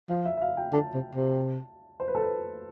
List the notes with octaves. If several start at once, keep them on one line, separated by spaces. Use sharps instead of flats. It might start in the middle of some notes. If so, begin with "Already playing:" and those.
F3 F5
E5
E5
F5
G5
D3 A5
C3
C3
C5
B4
A4
B4